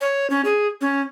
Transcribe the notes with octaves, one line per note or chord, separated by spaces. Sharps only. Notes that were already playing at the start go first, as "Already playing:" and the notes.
C#5
C#4
G#4
C#4